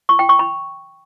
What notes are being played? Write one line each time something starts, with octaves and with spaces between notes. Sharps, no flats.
C#6
G5
C#6
B5